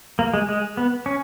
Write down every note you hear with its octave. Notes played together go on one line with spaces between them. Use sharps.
A#3
G#3
G#3
B3
C#4